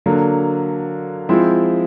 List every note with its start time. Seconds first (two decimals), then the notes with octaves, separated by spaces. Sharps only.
0.06 D3 F#3 A#3
1.29 F3 G#3 C4 E4